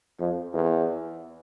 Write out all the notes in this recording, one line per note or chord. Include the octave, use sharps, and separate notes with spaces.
F2
E2